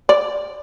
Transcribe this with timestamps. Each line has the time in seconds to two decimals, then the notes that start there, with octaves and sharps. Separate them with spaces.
0.09 D5